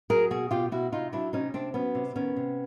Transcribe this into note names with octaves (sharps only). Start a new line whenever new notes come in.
F#3 G#4 A#4
B2 F#4 G#4
B2 F4 G4
B2 E4 F#4
C3 D#4 F4
F#3 D4 E4
C3 C#4 D#4
C3 C4 D4
F#3 B3 C#4
C3
D#3 B3 C#4
C3